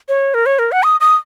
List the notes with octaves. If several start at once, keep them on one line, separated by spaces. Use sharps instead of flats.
C#5
A#4
C#5
A#4
F#5
D#6
D#6